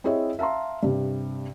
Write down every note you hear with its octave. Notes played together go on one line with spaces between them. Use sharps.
C4 E4 G#4 C#5 D#5 E5
E5 F5 A5 A#5 C6
G2 C3